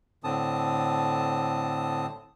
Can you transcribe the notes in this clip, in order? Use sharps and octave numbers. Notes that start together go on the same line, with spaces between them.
A2 D3 C4 A5 D#6